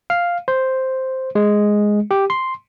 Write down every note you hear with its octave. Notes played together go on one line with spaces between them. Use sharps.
F5
C5
G#3
G4
C6